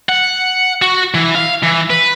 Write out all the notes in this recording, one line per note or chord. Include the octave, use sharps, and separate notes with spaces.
F#5
F#4
E3
F5
E3
B4